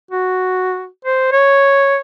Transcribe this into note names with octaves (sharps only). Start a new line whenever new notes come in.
F#4
C5
C#5